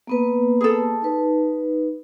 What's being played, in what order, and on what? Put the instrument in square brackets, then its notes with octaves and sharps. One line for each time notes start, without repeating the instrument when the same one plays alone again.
[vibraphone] A#3 B3 B4
[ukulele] G#4 A4
[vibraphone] D#4 B4